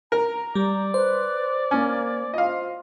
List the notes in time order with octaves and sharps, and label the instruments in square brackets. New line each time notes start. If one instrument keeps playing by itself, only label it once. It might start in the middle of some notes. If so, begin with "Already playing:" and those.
[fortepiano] A#4 [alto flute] A#5
[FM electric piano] G3 [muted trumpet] D5
[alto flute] B4 [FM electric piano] C5
[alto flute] A#3 [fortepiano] C#4
[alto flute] F4 [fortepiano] D#5 F5